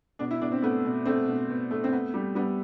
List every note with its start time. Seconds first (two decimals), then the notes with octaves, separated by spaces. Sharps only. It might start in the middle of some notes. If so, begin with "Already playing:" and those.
0.19 B2 D4
0.31 E4
0.41 B2 D4
0.52 C4
0.62 A3 B3
0.85 B2
1.05 A3 C4
1.27 B2
1.50 B2
1.71 A3
1.84 C4
1.92 B3
2.14 G3
2.35 G3 B3